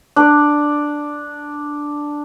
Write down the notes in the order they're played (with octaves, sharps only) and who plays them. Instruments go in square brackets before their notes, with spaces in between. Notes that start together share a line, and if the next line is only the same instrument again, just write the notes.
[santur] D4 D5